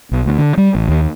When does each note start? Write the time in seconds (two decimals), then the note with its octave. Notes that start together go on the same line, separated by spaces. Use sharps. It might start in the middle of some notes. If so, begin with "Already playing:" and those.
0.12 B1
0.26 D2
0.38 D3
0.57 G3
0.75 A1
0.88 D#2